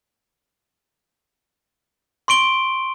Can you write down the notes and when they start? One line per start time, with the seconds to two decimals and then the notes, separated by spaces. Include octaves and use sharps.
2.28 C6 C#6 D7 G7